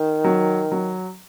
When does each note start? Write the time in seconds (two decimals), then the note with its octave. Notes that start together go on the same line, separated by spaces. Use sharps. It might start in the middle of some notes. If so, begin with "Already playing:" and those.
Already playing: D#3
0.24 F#3
0.72 F#3